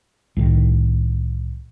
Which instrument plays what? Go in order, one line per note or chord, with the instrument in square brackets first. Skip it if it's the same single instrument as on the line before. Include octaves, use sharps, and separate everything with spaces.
[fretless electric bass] C2 A2 D#3